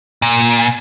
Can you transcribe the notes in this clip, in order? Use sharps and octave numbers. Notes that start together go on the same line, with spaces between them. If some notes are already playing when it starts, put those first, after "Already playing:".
A#2